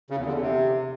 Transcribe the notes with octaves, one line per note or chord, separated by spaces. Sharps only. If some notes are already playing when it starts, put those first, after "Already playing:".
C#3
E2
D3
E2
C3